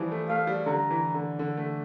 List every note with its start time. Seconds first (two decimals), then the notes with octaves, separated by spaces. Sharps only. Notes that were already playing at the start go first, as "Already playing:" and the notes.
Already playing: E3 F3 G3
0.11 A3
0.29 A3 F5
0.47 G3
0.66 D3 A#5
0.91 E3
1.14 D3
1.39 D3
1.57 A3